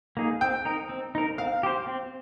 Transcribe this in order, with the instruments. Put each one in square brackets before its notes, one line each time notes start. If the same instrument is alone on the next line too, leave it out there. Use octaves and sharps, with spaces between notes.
[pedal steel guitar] A#3 D#4 G#4
[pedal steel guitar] C4 [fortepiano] G5
[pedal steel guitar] D#4 A#4
C4
D#4 A#4
[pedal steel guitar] C4 [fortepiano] F5
[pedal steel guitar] G4 C5
C4